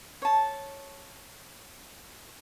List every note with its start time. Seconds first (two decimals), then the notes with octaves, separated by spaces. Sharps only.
0.22 C#5 A5